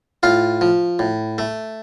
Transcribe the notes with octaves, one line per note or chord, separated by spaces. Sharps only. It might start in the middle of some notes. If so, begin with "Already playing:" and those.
A2 F4 F5
F3
A2
A3